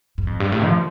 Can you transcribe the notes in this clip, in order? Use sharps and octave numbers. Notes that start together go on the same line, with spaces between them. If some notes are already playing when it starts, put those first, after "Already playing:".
G2
F2
G2
A2
F3